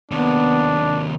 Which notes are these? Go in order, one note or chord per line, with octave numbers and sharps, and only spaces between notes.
D#2 C3 B3 D4